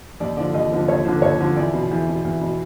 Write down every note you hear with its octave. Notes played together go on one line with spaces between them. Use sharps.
D#2 D5
D3 F3 D5
D#2 D#5
D3 F3
D#2 C#5
D3 F3 C5
D#2 C#5
D3 F3
E2 D5
B2
E2
B2
E2
B2